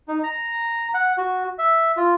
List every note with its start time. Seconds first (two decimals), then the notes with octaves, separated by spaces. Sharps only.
0.08 D#4
0.23 A#5
0.94 F#5
1.18 F#4
1.59 E5
1.97 F4